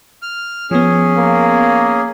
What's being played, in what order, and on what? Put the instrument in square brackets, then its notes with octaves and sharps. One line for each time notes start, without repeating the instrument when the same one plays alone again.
[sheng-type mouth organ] F6
[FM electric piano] F3 B3 [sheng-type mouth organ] C#4 G#4
[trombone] A#3